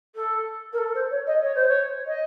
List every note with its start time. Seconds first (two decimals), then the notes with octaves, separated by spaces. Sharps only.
0.15 A4
0.72 A#4
0.78 A4
0.94 C5
1.11 C#5
1.26 D#5
1.42 C#5
1.55 C5
1.68 C#5
2.06 D#5